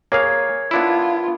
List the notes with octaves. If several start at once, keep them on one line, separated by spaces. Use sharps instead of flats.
A#3 G#4 A#4 C#5 F5 G#6
B3 D4 E4 F4